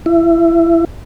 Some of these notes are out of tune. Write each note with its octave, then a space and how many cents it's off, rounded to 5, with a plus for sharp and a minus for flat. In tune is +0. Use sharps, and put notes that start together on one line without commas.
E4 +25